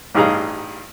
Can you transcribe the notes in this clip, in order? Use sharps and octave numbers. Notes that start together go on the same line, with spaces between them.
A1 G2 D#4 G#4 F5 A#5